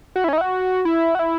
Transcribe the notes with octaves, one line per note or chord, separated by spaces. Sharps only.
F#4
E4
C#4
D#4
E4
F#4
E4
F#4
E4